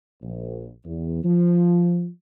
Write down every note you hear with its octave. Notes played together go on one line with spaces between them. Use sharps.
A#1
E2
F3